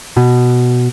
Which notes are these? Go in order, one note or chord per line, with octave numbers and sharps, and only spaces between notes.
B2